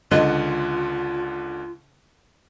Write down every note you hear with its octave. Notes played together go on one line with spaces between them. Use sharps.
C#2 D3 F4 D#5 F#6